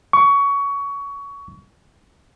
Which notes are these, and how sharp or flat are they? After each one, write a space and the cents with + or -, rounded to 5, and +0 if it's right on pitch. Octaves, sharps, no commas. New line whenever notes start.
C#6 +20